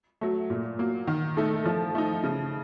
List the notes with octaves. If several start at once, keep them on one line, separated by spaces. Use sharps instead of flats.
F#3 A3
A#2
F#3 A#3
D#3
A3 D#4 A4
F3
A3 D#4
C#3